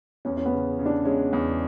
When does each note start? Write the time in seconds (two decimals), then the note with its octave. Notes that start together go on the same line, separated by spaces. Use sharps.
0.25 E2 C#4
0.37 C#4
0.46 B3
0.53 C#3
0.79 C#3
0.86 D4
1.05 G#3 C#4
1.33 E2